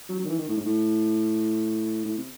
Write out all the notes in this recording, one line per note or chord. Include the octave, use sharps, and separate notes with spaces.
F#3
F#3
D#3
E3
D#3
A2
G#2
A2
A2
C3